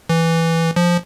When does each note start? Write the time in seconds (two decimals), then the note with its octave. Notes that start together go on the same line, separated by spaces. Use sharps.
0.09 E3
0.76 F3